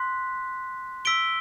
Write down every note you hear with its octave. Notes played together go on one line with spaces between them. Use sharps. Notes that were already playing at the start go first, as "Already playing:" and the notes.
Already playing: C6 F#6 B6
E6 B6 D7 G7